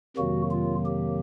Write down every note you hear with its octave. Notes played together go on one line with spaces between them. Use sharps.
F2 C3 D#3 F#3 A#3 F#4
F4
G4